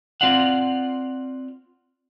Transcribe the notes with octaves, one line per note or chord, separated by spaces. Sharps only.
C4 F4 D5 F5 F#5